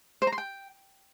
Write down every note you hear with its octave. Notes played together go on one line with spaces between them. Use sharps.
C5
A#5
C6
G5